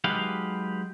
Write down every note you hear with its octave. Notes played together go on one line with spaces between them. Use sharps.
F#3 G#3 D#4 G4 B4 F5